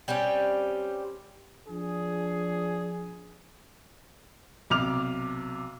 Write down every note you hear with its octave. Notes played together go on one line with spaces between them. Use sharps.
G3 C4 C#4 G4
F3 D4 G#4
B1 C3 D6 F6 F7